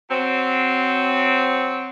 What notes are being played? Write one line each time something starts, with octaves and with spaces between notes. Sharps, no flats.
F#3 C4